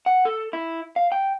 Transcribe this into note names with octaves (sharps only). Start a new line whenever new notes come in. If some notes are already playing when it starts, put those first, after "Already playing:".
F#5
A4
E4
F5
G5